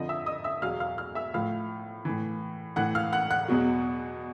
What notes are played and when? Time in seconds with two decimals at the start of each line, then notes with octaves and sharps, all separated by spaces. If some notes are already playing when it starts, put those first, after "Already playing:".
Already playing: F2 D3 F3 D#5 D#6
0.09 E5 E6
0.26 D#5 D#6
0.44 E5 E6
0.62 E2 B2 F#3 F5 F6
0.80 F5 F6
0.98 F5 F6
1.15 E5 E6
1.34 A2 F3 F5 F6
2.05 A2 E3
2.76 A2 E3 F#5 F#6
2.95 F5 F6
3.13 F#5 F#6
3.30 F#5 F#6
3.48 E2 B2 F#3